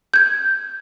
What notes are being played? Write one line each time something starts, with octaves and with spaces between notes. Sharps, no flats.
G6 G#6